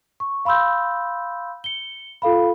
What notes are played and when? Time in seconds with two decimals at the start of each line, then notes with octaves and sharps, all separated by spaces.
0.20 C#6
0.45 F5 B5 C6 E6 G6
1.64 C#7 G7
2.22 F4 A4 F5 B5